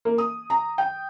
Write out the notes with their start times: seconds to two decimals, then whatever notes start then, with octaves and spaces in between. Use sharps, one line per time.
0.05 A#3
0.18 D#6
0.50 A#5
0.78 G5